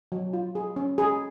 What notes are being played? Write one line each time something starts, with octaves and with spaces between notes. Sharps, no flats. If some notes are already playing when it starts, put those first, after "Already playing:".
F#3
F4
G#4
C#4
G#4